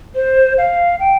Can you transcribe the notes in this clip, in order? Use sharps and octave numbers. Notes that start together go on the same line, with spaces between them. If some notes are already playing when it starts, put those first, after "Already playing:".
C5
F5
G5